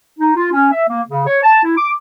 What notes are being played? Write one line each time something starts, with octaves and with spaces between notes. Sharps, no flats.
D#4
F4
C#4
E5
A#3
C#3
C#5
A5
E4
D6